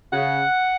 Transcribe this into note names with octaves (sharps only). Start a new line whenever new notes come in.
C#3 F#5